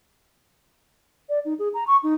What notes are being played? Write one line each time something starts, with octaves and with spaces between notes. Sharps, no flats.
D5
D#4
G#4
A#5
C#6
D#4